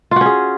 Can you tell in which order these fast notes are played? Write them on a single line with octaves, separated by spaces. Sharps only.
F4 F#4 C#4 G#4